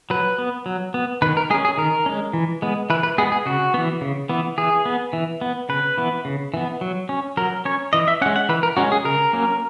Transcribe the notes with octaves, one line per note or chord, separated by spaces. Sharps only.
F#3 B4
B3
F#3
B3
D#3 B4
A#4
G#3 G#4
C#4
G#4
D#3 A#4
G#3 C#4
E3
G#3 B3
E3 B4
B4
G#3 B3 G#4
G#4
C#3 F#4
E3 B3
C#3
E3 B3
E3 G#4
B3
E3
B3
C#3 B4
E3 B3
C#3
E3 B3
F#3
C#4
F#3 A#4
C#4 C#5
E3 D#5
E5
G#3 C#4 F#5
F#5
E3 B4
A#4
G#3 C#4 F#4
G#4
C#3 A#4
F#3 A#3 C#4